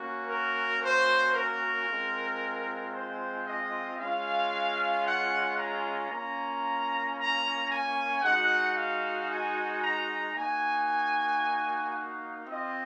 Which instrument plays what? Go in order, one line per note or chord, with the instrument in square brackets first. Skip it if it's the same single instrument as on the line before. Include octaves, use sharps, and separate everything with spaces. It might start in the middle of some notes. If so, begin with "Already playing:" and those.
Already playing: [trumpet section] A#3 C#4 F#4
A#4
C5
A#4
G#3 C4 F4
C5
D#5
G#3 C#4 F4 F5
F#5
A#5
A#3 C#4 F4 A#5
A#5
G#5
G#3 D#4 F#4 F#5
F5
G#5
A#5
A#3 D#4 F#4 G#5
F5
C4 F4 D#5